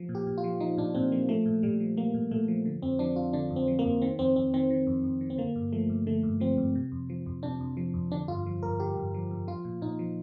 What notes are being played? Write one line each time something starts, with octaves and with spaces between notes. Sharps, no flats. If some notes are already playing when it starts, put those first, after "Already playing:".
Already playing: F3
A#2
G4
A#2
F4
F3
F3 D#4
A#2 D4
A#2 C4
F3 A#3
F3 A3
A#2
A#2 G3
F3
F3 A#3
A#2
A#2 A3
F3
D3
F2 C4
F3 D4
F2 F4
D3 D4
F2
C4
F3
A#3
F2
D#3 C4
F2 C4
F2 C4
D#3 C4
D#3
F2
F2
D#3
C4
D3 A#3
G2
F3 A3
G2
D3 A3
G2
F3 C4
G2
C3
F2
F3
F2
C3 D4
F2
F3
F2
D3 D4
G2 F4
F3
G2 A#4
D3 G4
G2
F3
G2
F3 F4
A#2
A#2 D#4
F3